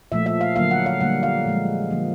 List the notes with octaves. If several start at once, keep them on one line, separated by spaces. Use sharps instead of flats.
A#2 F3 A3 E5
E5
F5
D3 F#3 A#3 F5
F#5
F5
D3 G3 A#3 F#5
F5
A#2 F3 G#3
D3 F3 A#3